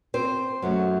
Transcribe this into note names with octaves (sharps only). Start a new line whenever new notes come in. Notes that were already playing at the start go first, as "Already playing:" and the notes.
C4 C5
F#2 F#3 A3